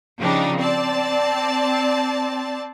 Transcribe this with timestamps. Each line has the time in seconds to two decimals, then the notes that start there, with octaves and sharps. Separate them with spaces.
0.19 C#3 F3 G3 D4 D#4
0.58 C4 D5 A5